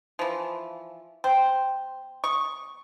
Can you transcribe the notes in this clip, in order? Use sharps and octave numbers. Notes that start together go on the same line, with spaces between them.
E3 F3
C5 G5 C6
C#6 D#6